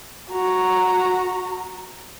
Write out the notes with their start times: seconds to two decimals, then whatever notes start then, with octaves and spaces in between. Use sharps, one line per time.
0.30 F#4 A#5